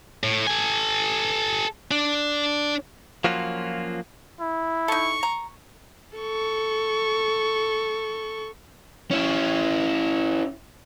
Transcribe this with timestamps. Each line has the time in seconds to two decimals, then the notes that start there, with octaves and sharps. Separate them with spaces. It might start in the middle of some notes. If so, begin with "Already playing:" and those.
0.23 A2
0.47 A4 G#5
1.91 D4
3.24 F3 F#3 A#3 C#4 F4 F#4
4.40 E4
4.88 D#4 A4 C#6
5.23 A#5
6.17 A4 C#6
9.11 C#4 E4